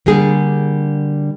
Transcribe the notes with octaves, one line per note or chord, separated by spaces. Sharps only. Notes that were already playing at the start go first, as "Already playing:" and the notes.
D3 G3 A#3 G#4